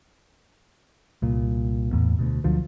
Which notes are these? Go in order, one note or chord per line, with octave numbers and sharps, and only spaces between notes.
C2 A#2
E2 A2 B3
D2 B2
D2 D3 F3 F#3